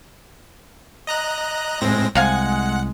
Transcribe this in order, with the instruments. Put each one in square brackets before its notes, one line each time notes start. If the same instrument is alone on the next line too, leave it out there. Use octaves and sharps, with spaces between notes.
[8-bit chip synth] D#5 A#5 F#6
[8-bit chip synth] A2 C4 A#6 [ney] G#3
[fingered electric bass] C2 [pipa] C3 F5 G#5 [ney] G#3 [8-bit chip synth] F#5